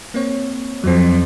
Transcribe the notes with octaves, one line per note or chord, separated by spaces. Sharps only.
A#3 C4 C#5
F2 F#3 C4